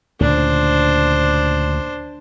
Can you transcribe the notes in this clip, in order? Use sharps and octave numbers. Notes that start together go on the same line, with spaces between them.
D2 A#2 C#3 D4 C5